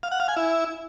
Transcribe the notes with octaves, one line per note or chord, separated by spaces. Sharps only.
F5
F#5
F5
G#5
E4